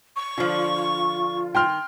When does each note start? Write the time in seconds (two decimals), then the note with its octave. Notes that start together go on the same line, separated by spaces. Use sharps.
0.17 C#6
0.38 D3 F3 F4
1.55 D#3 G5 C6 F6